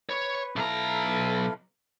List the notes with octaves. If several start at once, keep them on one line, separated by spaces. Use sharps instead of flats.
B4 C#5
B1 E4 A4 F5 A#5